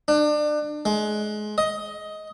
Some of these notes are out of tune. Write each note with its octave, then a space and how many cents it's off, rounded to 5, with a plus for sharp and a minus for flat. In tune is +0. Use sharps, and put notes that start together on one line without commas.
D4 +30
G#3 +25
D#5 +15